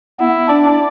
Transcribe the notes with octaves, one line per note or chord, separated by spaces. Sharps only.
B3 E4
D4 D5